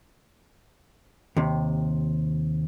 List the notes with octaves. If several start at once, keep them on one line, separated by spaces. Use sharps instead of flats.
D#2 C3